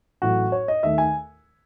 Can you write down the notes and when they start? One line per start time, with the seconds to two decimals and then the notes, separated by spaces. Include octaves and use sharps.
0.22 A1 A2 F#3 F#4
0.52 C#5
0.68 D#5
0.83 D#2 D#3 A3 E5
0.98 G#5